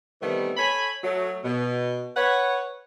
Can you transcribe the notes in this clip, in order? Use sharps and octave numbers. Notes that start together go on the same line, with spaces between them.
C3 D#3 E3 G3 A3 B3
A4 C#5 G#5 B5
F#3 A3
B2
B4 C#5 F#5